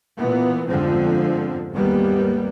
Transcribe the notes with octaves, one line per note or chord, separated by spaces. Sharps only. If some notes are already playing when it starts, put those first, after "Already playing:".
A#2 E3 B3
G1 F2 G#2 D3 F3 C4
G#1 D#2 G3 A#3 B3